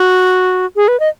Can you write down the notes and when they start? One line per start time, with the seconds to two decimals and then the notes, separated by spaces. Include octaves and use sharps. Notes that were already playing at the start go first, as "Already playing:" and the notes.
Already playing: F#4
0.76 G#4
0.88 B4
1.00 D#5